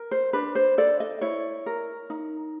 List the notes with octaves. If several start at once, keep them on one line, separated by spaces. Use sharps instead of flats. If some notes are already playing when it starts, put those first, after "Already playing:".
Already playing: A#4
C5
D4 B4
C5
A4 D5
D#5
E4 C#5
A#4
D#4